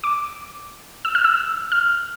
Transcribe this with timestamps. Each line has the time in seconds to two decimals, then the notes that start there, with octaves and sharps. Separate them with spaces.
0.04 D6
1.05 E6
1.15 F6
1.24 E6
1.72 F6